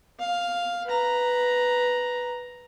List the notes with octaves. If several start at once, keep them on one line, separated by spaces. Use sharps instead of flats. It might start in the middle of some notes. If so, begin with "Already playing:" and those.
F5
B4 A#5